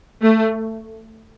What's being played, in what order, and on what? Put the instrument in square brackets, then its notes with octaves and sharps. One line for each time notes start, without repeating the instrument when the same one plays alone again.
[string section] A3